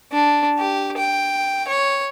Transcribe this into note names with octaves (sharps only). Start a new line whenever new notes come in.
D4
G4
G5
C#5